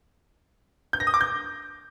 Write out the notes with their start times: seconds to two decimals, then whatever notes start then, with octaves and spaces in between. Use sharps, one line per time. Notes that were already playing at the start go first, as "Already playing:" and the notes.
0.93 G6
1.00 A#6
1.07 D#6
1.14 D6
1.21 G6